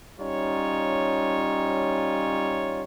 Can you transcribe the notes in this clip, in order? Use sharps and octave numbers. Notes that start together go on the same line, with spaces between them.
G3 C#4 D#4 F4 C#5